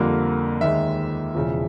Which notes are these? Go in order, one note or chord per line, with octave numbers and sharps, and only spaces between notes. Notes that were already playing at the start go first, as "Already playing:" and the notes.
Already playing: F2 D3 G3 A#3
D#2 D#3 G#3 E5
E1 E2 C#3 F3